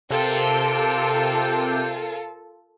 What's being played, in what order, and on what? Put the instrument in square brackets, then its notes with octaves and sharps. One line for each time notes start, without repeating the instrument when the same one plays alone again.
[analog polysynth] C3 G5 [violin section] F4 A4 A#4